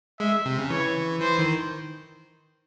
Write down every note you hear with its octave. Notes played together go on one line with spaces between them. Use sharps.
G#3 E5
C3
C#3
E3 C#5
E3 C5
D#3